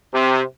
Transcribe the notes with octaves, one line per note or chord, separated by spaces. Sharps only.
C3